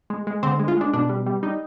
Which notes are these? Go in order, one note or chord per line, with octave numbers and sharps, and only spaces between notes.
G#3
G#3
D3 C4
G#3
F4
G#3 D4
B2 D4
G3
G3
G3 D#4